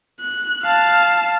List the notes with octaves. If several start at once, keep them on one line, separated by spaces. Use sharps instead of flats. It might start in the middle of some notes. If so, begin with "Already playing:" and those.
F#6
F5 A5